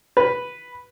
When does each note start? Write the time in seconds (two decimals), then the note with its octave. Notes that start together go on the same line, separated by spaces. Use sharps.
0.17 B4